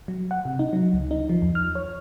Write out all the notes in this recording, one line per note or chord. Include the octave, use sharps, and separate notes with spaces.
F#3
F#5
C3
D#4
F#3
C#2
D#4
F3
E2
F6
C#5